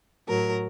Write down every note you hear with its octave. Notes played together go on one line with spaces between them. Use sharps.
A2 F#3 A#4